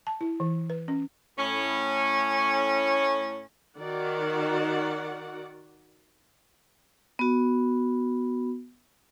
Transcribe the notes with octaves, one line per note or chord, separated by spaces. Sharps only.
A5
E4
E3
B4
C#4
A2 C#4
D#3 F#4 D5 F#5
B3 F#4